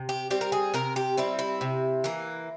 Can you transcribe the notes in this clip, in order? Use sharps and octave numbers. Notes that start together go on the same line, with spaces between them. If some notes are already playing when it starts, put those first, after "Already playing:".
Already playing: C3
G4
G3 C4 G4
A#4
G#4
C3 A#4
G4
G3 C4 E4
E4
C3
E3 A#3